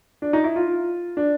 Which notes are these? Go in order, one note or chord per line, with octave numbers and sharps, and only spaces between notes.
D4
D#4
E4
F4
D4